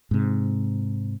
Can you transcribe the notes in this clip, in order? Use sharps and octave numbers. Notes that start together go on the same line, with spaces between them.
G#2 C3